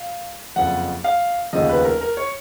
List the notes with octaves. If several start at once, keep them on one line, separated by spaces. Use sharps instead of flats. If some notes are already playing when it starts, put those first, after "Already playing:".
Already playing: F5
F#1 F2 F3 F#5
F5
F1 D#2 C#3 F3 D#5
B4
A#4
A#4
C#5